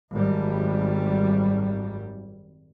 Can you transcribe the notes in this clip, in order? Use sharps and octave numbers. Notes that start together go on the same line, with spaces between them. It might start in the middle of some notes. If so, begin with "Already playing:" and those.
G#1 F#2 G3